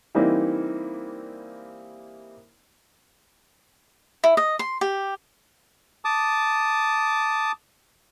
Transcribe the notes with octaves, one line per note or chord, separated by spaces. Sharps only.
E3 G3 A#3 C4 D#4 E4
E4
D#5
C6
G4
A5 D6 D#6